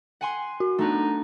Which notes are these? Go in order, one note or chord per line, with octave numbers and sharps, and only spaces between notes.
F#5 G#5 C6
F#4
A3 B3 D4 D#4